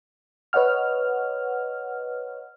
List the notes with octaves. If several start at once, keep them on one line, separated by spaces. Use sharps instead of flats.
B4 C#5 D#5 F#5 F6